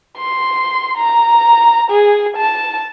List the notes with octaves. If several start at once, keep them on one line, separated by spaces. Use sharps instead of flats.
C6
A#5
G#4
A5